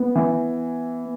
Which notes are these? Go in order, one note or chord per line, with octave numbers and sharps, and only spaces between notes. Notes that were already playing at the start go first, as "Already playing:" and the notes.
Already playing: B3
E3